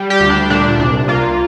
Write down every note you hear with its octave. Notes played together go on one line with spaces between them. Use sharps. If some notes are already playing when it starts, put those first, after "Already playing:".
Already playing: G3
G4
D2
D4
A#2 D4
C2 D4
A#3 F4